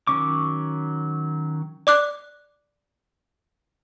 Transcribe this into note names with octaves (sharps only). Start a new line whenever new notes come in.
D#3 F#3 C#4 C#6 D6
D5 D6 F#6